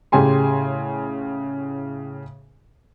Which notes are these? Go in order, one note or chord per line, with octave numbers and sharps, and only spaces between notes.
A2 C#3 G4 G#4 G#5 C6